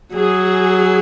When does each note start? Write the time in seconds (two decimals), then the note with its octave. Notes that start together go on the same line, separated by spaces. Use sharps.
0.13 F#3 G#4